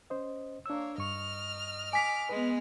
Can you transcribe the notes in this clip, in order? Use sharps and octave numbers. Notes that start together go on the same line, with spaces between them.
C#4 C5 D#5
A#3 D4 C#5 E6
G2 D#5 C#6 F6
G#5 D6 B6
G#3 B3 B4